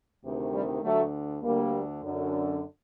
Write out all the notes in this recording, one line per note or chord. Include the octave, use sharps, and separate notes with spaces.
D2 C3 D#3
G3
D2 D3 F#3 A3
D2 D3 G3 A#3
F#2 D3